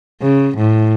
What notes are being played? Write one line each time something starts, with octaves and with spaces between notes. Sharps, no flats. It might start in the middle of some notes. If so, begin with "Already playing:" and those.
C#3
A2